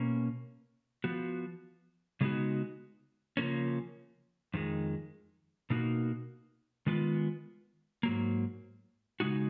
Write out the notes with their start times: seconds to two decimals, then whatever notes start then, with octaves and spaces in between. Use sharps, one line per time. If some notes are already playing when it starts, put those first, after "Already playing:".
Already playing: B2 A#3 C#4
1.04 F3 B3 F#4
2.21 C#3 G#3 B3 D#4 F#4
3.37 C#3 F3 A#3 C#4
4.54 F2 D#3 G#3
5.70 B2 A#3 D#4 F#4
6.87 D#3 G#3 B3 F4
8.03 G#2 F#3 A#3
9.20 C#3 G#3 D#4 F#4